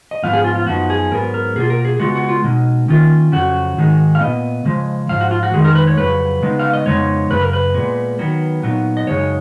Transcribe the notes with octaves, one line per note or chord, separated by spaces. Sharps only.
D#5
G#2 F3 B3 F5
G#4
F4
F4
F#2 F3 B3 D#4 F#4
G#4
G#2 F#3 B3 A#4
A#4
B2 A#3 F4 G#4
A#4
G#4
C#3 G#3 B3 F4 F#4
F#4
F4
B2 G#3 D#4
D#3 A#3 C#4 F4
F2 C#3 F#3 F#4
G#2 D#3 G#3 D#4
F5
A#2 F3 B3 D#5
C#3 F3 G#3
G#2 F3 F5
F#4
F4
F#4
F2 D#3 G#3 D#4 G#4
A#4
B4
C#5
F2 C#3 F#3 B4
C#3 G#3 B3 D#4
F5
D#5
F2 C#3 G#3 B3 D#4 C#5
F#2 C#3 B4
A#4
B4
A#2 G#3 B3
D#3 F#3 B3
A#2 F#3 B3 D#4
D#5
F#2 C#3 G#3 D#4 C#5